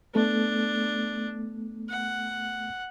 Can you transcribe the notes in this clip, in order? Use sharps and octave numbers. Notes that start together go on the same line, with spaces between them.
A3 B3 D4 A4
F#5